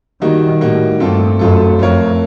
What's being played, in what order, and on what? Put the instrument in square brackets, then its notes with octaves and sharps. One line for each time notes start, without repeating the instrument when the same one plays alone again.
[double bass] D#3 [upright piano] G3 A#3 D#4 F#4
[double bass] A2 [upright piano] G3 A#3 D#4 F#4
[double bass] G2 [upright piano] A3 C4 F4 A4
[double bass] F#2 [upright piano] A3 C4 F4 A4
[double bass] F2 [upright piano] A3 C4 F4 A#4 C#5